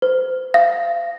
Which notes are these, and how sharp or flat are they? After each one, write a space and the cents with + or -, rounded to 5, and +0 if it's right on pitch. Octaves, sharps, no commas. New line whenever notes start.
C5 -30
F5 -35